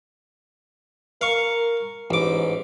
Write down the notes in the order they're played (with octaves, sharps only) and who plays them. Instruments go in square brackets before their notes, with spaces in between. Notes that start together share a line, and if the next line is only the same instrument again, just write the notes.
[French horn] A#4 [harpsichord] F5 C#6
[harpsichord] A1 D6 [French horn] G#2